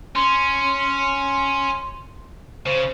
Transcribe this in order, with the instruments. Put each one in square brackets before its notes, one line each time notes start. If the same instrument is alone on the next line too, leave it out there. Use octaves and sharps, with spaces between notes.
[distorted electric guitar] C#4 [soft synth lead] C6
[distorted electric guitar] C#3 [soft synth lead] C5